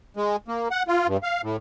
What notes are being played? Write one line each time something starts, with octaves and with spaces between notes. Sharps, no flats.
G#3
A#3
F#5
F4
G2
F5
A2